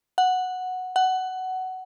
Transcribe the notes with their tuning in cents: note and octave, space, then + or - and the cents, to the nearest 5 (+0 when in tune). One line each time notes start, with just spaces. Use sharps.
F#5 -5
F#5 +15